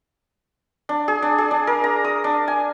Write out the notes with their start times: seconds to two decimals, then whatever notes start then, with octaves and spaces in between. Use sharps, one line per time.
0.89 D4
1.08 G#4
1.22 D4
1.38 G#4
1.51 D4
1.67 A#4
1.84 A#5
2.04 D#6
2.24 D4
2.48 G#5